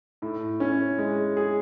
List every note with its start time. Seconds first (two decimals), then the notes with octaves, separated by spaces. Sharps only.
0.22 A2
0.60 C#4
0.98 G#3
1.37 G#4